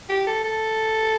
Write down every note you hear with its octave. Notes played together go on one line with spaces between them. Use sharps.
G4
A4
A4